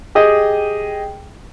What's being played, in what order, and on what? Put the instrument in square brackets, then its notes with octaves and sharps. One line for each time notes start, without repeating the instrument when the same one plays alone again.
[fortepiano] G4 G#4 D#5 G5